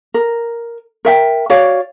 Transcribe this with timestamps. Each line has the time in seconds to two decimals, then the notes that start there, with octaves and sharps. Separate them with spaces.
0.14 A#4
1.05 A#4 E5 G5
1.50 F#4 C#5 D5 F5